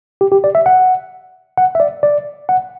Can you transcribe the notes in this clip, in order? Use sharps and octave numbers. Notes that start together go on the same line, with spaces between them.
G4
G4
D5
E5
F#5
F#5
E5
D5
D5
F#5